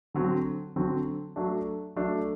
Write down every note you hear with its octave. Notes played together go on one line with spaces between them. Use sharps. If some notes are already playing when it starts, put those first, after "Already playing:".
D3 F#3 C4
D3 F#3 C4
F#3 A3 D4
F#3 A3 D4